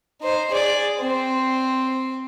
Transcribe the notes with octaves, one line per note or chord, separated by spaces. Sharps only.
D#4 C5
G#4 D5
C4 C5